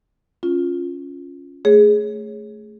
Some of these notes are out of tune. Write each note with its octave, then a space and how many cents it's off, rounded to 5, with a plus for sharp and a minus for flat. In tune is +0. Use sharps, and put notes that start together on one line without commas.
C#4 +0 F4 +0
A3 +0 G#4 +0 C#5 -10